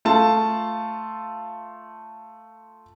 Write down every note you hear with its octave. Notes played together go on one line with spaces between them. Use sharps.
A3 F4 A5